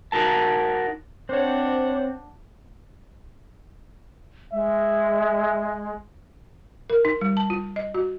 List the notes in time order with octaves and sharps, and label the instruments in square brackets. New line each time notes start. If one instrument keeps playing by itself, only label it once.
[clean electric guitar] D#4 F#4 A#4 A5
[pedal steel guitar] C4 [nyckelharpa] D4 F#5 [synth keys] C5 C#5
[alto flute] G#3 [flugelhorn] E5
[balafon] A#4
D#4
G3
A5
F4
D#5
F#4